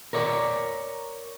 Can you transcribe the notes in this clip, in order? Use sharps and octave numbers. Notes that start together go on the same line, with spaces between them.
A#4 C#5 D5